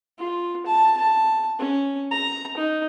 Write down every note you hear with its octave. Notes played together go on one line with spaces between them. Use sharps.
F4
A5
A5
C#4
A#5
D#4